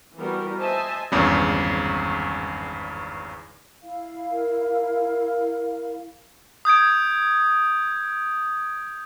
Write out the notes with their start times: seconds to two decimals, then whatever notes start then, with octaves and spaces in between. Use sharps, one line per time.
0.16 E3 G3 B3 F#4 A#4
0.59 C5 D#5 E5 G#5 A5
1.12 G#1 E2 G2 C#3
3.83 E4 F5
4.32 A#4
6.65 D#6 G6 G#6 D7